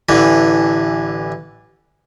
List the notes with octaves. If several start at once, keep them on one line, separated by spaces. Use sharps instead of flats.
A1 D3 E3